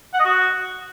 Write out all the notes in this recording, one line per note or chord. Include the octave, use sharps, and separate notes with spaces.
F#5
D#5
F#4